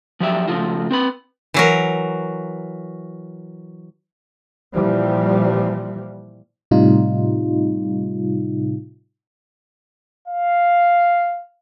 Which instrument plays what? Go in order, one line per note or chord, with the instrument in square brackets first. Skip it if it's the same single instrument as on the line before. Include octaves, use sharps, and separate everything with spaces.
[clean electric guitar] F3 F#3 G4 D5 E5
C#3 F3 A3 F4 F#4
C4 B4 B5
[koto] E3 F#3 A#4
[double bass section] A#2 E3 F3 G3
[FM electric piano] A2 C3 G3 D#4 F4
[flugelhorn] F5